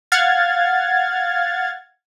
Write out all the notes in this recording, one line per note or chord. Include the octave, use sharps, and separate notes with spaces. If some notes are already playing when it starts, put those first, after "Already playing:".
F5 F#5 F6 G#6 A6